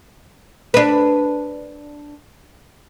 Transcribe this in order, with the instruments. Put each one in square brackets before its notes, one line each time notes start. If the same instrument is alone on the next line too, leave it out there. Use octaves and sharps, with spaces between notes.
[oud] D4 B4